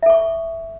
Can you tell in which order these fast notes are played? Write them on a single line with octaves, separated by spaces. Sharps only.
E5 A4 C#6